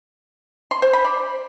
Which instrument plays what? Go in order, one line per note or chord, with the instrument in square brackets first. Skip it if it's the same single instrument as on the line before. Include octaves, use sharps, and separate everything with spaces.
[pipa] C6
C5
B5
D5